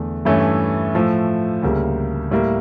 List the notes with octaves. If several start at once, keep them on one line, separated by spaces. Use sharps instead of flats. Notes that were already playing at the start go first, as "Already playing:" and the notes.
Already playing: E2 D3 A3
G2 E3 A3 C#4
A2 F3 A3
D2 C#3 G3 A#3
A2 G3 A#3